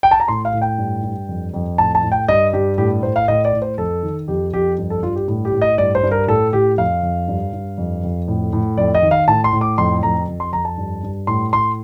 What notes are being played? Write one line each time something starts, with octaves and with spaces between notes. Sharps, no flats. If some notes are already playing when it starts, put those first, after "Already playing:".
G5
A5
A#5
A2 C6
F5
A2
G5
G2
G2
F2
F2
A2 A5
A5
A2
G5
G2 D#5
G2 G4
A2 G4
A2 C5
F5
A2 D#5
D5
A2
C5
F2 A4
D#3
F2 G4
F2 G4
G2
A4
G2 F4
G4
A2
G4
A2
D#5
G2 D5
C5
G2
A#4
A2 A4
A2 G4
F2 F5
F2
G2
G2
F2
F2
A2
A2
F2 D5
D#5
D#3
F5
A2 A5
C6
A2
D6
F2 C6
F2 A#5
F2
C6
F2 A#5
A5
G2
G2
A2 C6
A2 C6